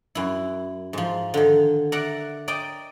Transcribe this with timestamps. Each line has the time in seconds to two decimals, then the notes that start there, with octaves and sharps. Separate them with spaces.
0.15 F#2 E4
0.93 G#2 F3
1.34 D3 D#3
1.92 A#4 D5 E5 F#5
2.48 A#4 D5 D#5 G5